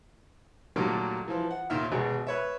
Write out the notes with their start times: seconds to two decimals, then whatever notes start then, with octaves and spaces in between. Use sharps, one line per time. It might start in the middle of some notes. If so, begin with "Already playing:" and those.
0.76 A#2 D#3 F#3 G3 A3 A#3
1.28 E3 F3
1.51 F#5
1.70 D#2 A#2 D#3 A#4 E5 F6
1.92 G#1 B2 G#4
2.27 B4 C#5 E5